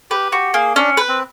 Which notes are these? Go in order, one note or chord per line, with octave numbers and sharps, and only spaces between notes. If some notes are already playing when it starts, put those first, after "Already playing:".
G4 B4
F#4 G4
A#3 G#4
C#4 D4
B4
C4